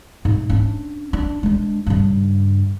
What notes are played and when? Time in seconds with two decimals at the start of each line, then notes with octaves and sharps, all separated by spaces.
0.25 G#2
0.50 C#4 D4
1.13 D4
1.43 G#3 D4
1.86 G2 C#3